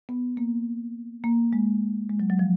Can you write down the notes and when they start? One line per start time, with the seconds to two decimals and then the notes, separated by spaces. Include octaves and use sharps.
0.09 B3
0.37 A#3
1.24 A#3
1.53 G#3
2.10 G#3
2.20 F#3
2.30 F#3
2.39 F3